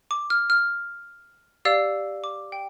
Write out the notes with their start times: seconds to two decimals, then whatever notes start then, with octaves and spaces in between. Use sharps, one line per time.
0.11 D6
0.30 F6
0.50 F6
1.65 G4 D5 F5 E6
2.24 D6
2.52 G5